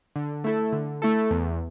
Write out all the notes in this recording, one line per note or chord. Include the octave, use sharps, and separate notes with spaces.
D3
A3 E4 A4
D3
A3 E4 A4
E2